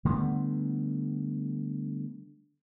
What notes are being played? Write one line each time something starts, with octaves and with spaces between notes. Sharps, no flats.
D3 G3 A3 B3